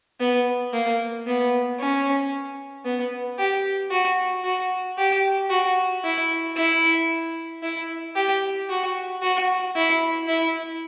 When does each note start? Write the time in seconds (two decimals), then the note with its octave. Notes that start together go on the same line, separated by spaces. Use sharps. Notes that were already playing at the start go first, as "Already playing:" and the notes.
0.20 B3
0.73 A#3
1.27 B3
1.79 C#4
2.85 B3
3.39 G4
3.91 F#4
4.44 F#4
4.98 G4
5.50 F#4
6.04 E4
6.56 E4
7.63 E4
8.16 G4
8.70 F#4
9.22 F#4
9.76 E4
10.28 E4